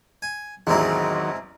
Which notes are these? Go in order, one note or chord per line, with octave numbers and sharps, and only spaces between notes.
G#5
A1 E2 D#3 F#3 G#3 C4 E4